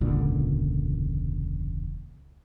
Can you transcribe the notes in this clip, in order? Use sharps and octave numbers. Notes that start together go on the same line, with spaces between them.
E1 C#2 A#2 D3